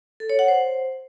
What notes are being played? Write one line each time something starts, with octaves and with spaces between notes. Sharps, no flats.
A4
C#5
F#5
C5